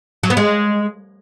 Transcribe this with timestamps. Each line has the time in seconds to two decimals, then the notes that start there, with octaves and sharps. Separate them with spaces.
0.23 F#3
0.30 B3
0.37 G#3